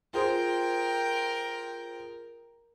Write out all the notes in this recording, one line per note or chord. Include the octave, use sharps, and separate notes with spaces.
F4 G#4 A#4 C5 G5